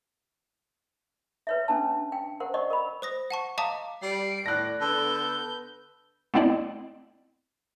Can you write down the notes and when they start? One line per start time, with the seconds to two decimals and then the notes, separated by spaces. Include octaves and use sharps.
1.47 B4 C#5 E5
1.68 C#4 D4 A5
2.12 G5
2.40 A#4 C5 F#5
2.54 D5 D#5 C#6
2.70 A#4 B5
3.02 C5 D#6 A#6
3.30 F#5 A5 C#6
3.58 D#5 F5 A5 A#5 D6 D#6
4.02 G3 C7 D7
4.46 A2 D5 F#6 A#6
4.81 D3 B3 A4 G6
6.34 A3 B3 C4 E4 D5 D#5